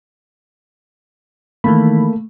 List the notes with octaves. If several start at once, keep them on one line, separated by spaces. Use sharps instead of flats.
D#3 E3 A3 A#3 B5